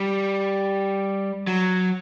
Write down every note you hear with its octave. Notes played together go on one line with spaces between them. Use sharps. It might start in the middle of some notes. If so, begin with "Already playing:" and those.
Already playing: G3
F#3